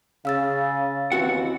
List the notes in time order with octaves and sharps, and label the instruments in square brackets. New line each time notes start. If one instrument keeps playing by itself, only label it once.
[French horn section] C#3 [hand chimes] F5 E6 A6
[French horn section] D#2 C#3 E3 [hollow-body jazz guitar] C4 F#4 F#5